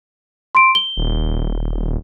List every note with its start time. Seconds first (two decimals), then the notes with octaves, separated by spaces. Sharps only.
0.55 C6 D7
0.75 G7
0.97 D#1